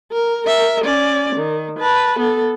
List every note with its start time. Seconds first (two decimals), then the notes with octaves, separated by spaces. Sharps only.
0.12 A#4
0.47 A#4 E5
0.85 C#4 D5
1.36 D#3
1.80 B4 A5
2.19 B3 A4